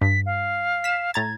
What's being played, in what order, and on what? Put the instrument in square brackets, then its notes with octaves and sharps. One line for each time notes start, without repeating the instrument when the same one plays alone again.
[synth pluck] G2 [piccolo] B6
[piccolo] F5
[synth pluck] B6 E7
[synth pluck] A2 A#5 A6 [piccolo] G#6